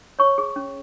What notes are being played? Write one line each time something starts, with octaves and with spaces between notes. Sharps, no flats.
C#5 C#6
G#4
C#4